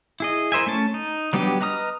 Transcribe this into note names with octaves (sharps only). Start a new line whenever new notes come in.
E4 G#4 D#5
E4 A#4 C5 E5 G#5
A3 C#4 A5
D#4
F#3 G3 B3 D4 G4
B4 D#5 A#5 D#6 F6